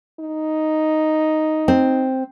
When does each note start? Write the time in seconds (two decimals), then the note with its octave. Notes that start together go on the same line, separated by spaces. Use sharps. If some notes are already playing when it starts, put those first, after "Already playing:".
0.20 D#4
1.68 C4